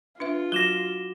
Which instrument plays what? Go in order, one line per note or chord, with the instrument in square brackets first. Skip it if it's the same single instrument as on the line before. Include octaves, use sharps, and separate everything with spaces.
[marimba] D4 B4 E5 [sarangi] F4
[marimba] F#3 [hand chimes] F#4 D6 [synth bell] A#6 E7 G7